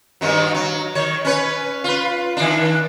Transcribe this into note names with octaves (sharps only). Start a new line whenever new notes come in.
G2 D#3 F#3
F#3
D#3 C#5
C#4 B4 C#5
F4 B4
D#3 D4